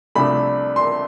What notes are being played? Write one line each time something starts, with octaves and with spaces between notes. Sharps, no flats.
C2 C3 F3 A3 D4 B5
C6